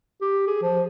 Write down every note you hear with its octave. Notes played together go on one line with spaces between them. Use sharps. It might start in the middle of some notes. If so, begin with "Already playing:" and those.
G4
G#4
F3